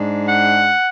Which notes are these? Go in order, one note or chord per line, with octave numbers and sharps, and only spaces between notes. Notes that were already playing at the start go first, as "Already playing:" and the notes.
Already playing: G#2 G#3 D4
F#5